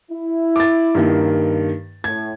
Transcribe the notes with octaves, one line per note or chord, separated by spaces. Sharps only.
E4
D6 A6
G2 D#3 A#3
A2 G#6